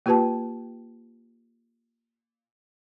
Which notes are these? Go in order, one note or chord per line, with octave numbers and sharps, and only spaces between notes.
A#3 F4 G4 B4 G5 A5